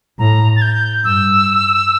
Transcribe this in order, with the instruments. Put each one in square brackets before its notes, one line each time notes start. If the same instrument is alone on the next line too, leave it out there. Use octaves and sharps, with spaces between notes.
[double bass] A2 [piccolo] A#5
[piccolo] A6
G6
[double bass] G2 [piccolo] E6